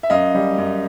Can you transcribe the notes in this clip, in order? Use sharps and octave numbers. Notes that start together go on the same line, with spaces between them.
E5
F#2 D#5 F5
G3
F#2